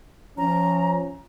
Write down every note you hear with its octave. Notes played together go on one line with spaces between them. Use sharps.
F3 C#4 A#5